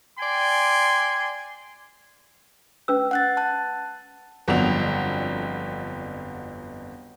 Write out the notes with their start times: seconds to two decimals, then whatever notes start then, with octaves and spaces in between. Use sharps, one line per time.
0.19 D5 G5 G#5 C6
2.88 C#4 B4 E6
3.11 F#5 F#6 A6
3.37 A5 F#6
4.48 G1 F2 D3 F#3 F7